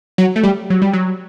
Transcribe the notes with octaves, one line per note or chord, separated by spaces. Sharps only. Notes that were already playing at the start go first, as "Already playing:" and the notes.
F#3
A3
G3
F#3
G3
F#3